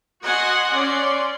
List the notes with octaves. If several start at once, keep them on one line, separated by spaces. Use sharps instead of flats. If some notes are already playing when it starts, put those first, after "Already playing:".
F#4 D#5 F#5 G#5 C6
C#4 D5 C6